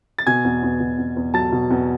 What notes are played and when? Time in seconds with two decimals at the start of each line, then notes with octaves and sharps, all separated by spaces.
0.18 A6
0.26 B2 G#5 G#6
0.44 E2
0.63 E2
0.80 B2
0.98 E2
1.17 E2
1.34 F#3 A5 A6
1.52 B2
1.70 E2